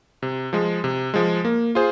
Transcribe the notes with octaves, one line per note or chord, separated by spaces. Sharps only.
C3
F3 G#3
C3
F3 G#3
A#3
F4 G#4 C5